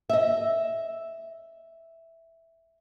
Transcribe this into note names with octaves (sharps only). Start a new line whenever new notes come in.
D#5 E5